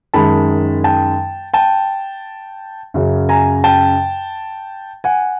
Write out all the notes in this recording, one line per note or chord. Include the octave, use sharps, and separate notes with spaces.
F#2 D#3 G#3 A5 B5
G5 A5
G5 A5
F#2 C#3 F#3
G#5 A#5
G5 A5
F#5 G#5